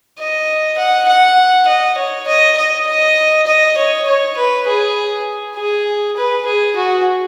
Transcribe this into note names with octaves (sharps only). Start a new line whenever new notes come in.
D#5
F#5
F#5
D#5
C#5
D#5
D#5
D#5
D#5
C#5
C#5
B4
G#4
G#4
B4
G#4
F#4